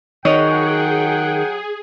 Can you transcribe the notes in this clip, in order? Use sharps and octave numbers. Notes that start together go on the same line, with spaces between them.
D#3 F#3 G#4 C#5 D#5 F#5 G5